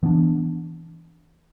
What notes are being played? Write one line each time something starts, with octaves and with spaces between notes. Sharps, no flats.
E3 B3 D4